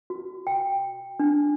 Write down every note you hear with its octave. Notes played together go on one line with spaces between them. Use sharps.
F#4
G5
D4